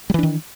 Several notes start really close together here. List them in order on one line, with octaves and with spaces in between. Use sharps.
G3 E3 D4 D#3